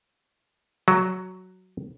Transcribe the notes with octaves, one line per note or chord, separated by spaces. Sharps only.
F#3